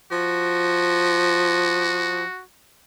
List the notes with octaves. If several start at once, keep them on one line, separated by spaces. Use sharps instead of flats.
F3 F#4